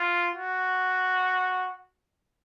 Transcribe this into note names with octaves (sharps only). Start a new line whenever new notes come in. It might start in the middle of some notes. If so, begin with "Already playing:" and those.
Already playing: F4
F#4